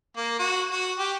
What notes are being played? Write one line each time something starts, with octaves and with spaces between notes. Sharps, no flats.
A#3
F#4
F#4
G4